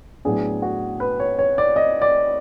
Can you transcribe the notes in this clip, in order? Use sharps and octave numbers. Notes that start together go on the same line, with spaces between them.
A2 F#3 B3 D4 G#4
F#4
B4
C#5
C#5
D5
D#5
D5